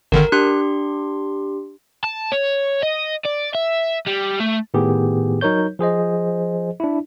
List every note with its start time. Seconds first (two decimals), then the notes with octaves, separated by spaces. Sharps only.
0.12 G#1 D3 D#3 A#4
0.32 D4 G4 C6 F#6
2.04 A5
2.32 C#5
2.83 D#5
3.25 D5
3.55 E5
4.07 G3
4.40 A3
4.74 A2 D#3 B3 G4 G#4
5.41 F#3 D#4 A#4 C#5 G6
5.79 F3 G#4 C5 D#5
6.80 D4 E4